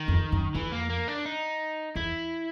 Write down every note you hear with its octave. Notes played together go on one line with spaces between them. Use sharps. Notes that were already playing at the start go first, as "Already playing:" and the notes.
Already playing: D#3
F2
F#2
F2 E3
A#3
A#3
D4
D#4
E2 E4